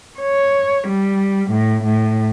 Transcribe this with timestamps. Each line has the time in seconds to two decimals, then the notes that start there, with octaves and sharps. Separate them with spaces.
0.19 C#5
0.88 G3
1.52 A2
1.84 A2